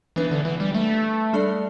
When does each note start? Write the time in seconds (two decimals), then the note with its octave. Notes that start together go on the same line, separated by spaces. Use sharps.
0.16 E3 B3 D4 B4 E5
0.31 D3
0.45 E3
0.60 G3
0.74 A3
1.33 G3 D4 A4 D5